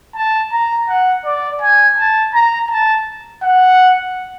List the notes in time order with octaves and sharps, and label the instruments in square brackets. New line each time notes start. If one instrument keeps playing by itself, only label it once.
[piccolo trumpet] A5
A#5
F#5
D5
G#5
A5
A#5
A5
F#5